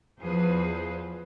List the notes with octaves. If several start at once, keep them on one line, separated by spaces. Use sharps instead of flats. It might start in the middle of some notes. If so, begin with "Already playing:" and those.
E2 F3 G#4 B4 C5